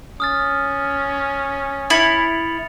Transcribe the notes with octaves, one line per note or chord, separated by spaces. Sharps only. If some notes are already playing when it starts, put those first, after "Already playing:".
C#4 D#6 F6 A6
E4 A6 C#7 F7